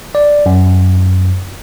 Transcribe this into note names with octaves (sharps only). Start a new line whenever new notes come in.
D5
F#2